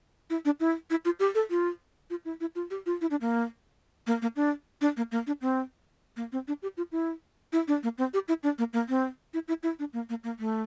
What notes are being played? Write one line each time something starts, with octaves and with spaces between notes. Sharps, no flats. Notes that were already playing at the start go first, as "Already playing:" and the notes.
E4
D4
E4
E4
F4
G4
A4
F4
F4
E4
E4
F4
G4
F4
E4
D4
A#3
A#3
A#3
D4
D4
A#3
A#3
D4
C4
A#3
C4
D4
G4
F4
E4
E4
D4
A#3
C4
G4
E4
D4
A#3
A#3
C4
E4
E4
E4
D4
A#3
A#3
A#3
A3